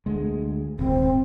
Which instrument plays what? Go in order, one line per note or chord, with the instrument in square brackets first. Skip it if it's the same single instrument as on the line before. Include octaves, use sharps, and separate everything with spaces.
[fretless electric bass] D2 G#3
[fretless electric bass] D#1 G#1 [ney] C4